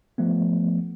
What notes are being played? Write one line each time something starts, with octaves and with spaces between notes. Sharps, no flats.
F3 A3 B3